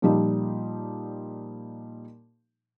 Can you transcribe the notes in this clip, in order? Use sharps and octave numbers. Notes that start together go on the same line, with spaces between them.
A#2 F3 G3 D#4 G4